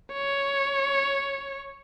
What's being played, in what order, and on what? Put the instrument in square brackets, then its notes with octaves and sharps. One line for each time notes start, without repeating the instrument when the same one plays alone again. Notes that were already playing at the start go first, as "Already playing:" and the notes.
[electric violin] C#5